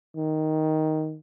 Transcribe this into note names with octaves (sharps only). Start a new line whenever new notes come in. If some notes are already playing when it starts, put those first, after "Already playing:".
D#3